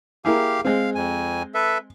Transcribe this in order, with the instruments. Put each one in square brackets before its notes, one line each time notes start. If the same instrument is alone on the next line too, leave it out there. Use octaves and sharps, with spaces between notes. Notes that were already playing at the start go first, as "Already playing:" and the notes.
[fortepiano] A#3 E4 G#4 [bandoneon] G4 F5
[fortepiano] G#3 C4 [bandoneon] F5
[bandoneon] F2 G#5
A4 B4 E5